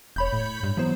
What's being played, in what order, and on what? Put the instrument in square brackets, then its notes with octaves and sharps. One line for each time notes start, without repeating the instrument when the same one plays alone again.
[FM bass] E1 [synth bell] C#5 B5 G6
[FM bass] A2
G2
[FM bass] E3 [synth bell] F#3 B3 C5